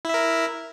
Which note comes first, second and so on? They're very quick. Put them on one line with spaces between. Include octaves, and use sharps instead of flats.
E4 E5 A#4